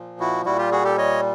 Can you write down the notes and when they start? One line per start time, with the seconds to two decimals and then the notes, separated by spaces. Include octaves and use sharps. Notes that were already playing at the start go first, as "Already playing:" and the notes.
Already playing: A#2 F3
0.20 E4 F#4
0.45 A#2 G3 E4 F#4
0.58 F4 G4
0.72 F#4 G#4
0.84 G4 A4
0.98 C#5 D#5